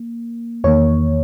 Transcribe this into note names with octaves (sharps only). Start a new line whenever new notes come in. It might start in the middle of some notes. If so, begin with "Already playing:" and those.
Already playing: A#3
E2 D#3 A#3 C#5